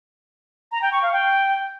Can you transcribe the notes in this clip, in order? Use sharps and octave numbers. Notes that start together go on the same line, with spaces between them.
A#5
G5
C#6
F5
G5